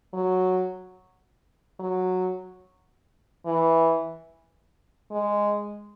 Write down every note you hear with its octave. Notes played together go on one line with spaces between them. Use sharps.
F#3
F#3
E3
G#3